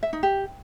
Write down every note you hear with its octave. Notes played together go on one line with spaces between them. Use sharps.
E5
D#4
G4